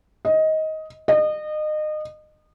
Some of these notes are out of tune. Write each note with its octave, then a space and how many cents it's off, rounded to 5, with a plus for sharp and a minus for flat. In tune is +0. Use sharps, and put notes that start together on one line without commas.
D#5 +15
D#5 -30